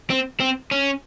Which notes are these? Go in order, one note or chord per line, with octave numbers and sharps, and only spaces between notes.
C4
C4
C#4